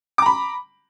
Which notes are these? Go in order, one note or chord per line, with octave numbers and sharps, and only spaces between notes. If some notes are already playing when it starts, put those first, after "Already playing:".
A#5 B5 D6